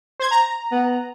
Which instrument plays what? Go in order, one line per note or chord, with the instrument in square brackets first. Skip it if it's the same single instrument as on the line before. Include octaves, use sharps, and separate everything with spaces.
[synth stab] C5 G#6
A#5
[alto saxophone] B3